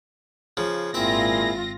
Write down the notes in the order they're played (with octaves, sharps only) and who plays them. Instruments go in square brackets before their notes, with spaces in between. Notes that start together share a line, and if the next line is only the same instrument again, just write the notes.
[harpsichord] C#3 F3
[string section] G#1 F4 A#6 [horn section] A#2 E4 G#4 [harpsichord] C4 E5